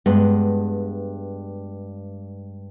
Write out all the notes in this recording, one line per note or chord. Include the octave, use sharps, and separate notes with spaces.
G2 G#3 B3